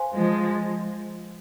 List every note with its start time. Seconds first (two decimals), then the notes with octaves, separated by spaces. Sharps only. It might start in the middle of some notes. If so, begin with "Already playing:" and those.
Already playing: C5 F5 G#5 C6
0.13 F3 G#3